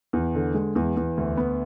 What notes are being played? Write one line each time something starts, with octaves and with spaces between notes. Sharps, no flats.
E2
D3
G#3
E2
E2
D2
B3